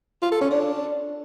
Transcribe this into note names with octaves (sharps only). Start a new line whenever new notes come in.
F4
A4
C#4
D4